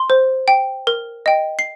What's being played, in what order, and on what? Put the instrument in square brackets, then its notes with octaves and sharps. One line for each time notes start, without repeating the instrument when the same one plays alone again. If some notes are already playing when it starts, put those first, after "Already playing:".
Already playing: [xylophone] C6
C5
G5
A#4
D#5 G5
C7